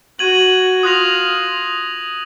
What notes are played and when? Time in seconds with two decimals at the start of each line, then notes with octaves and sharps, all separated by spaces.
0.19 F#4 G#6 D#7 F#7
0.83 F4 D#6 F#6 A#6 F7